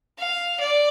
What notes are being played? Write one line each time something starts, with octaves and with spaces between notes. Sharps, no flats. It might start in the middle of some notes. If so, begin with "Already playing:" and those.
F5
D5